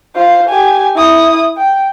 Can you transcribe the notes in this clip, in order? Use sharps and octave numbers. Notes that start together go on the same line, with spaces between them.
F4 C5
G4 G#5
E4 D#6
G5